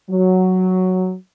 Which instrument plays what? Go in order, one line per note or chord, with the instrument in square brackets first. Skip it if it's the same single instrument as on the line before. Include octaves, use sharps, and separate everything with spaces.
[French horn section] F#3